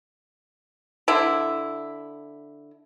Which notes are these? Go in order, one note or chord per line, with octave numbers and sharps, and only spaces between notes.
D3 E4